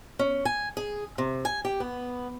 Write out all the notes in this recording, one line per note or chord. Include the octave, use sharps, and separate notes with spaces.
C#4
G#5
G#4
C3
G#5
G4
B3